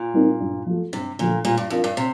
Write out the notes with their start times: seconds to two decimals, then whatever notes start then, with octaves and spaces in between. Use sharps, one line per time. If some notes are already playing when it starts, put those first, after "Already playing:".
Already playing: A#2
0.14 G3 C4 D#4 A#4
0.40 G2
0.66 F3 A3
0.93 G2 C3
1.19 A#2 D3 F3 A3
1.45 A#2 G3
1.58 G2
1.70 F2 D4 F4 A#4
1.84 G2
1.97 C3